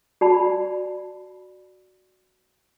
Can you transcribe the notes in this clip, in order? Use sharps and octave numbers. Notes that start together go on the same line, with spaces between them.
F#4 D5 A5 B5